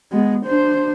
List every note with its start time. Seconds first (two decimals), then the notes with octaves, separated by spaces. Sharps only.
0.12 G#3 B3
0.45 D4 C5